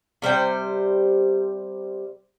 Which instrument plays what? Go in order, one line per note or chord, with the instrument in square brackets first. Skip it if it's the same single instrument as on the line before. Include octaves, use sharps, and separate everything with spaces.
[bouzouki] C3 G3 C5 G5